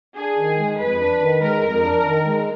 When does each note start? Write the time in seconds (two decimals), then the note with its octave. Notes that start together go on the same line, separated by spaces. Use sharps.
0.16 D4 G#4
0.37 D#3
0.58 G#3
0.78 F2 B4
0.99 D4
1.20 D#3
1.41 G#3 A#4
1.62 F2
1.83 D4
2.04 D#3
2.25 G#3